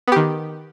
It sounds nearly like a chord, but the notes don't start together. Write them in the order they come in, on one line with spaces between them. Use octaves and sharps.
B3 G4 D#3